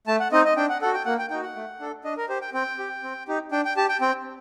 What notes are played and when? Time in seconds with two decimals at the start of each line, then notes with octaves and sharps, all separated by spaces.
0.07 A3 A5
0.20 F#5
0.32 C4 D#4 D#5
0.45 D#5
0.57 D4 G5
0.69 F#5
0.82 F#4 A4 F#5
0.94 G5
1.05 A#3 F#5
1.19 G5
1.30 D#4 F#4 G5
1.43 F#5
1.55 A3
1.80 D4 A4
2.04 D4 D#5
2.17 A#4
2.29 G4 C5
2.41 G5
2.53 C4 G5
2.79 G4
3.03 C4
3.28 D#4 G4
3.52 D4 G5
3.65 G5
3.77 G4 A5
3.89 G5
4.01 C4 G5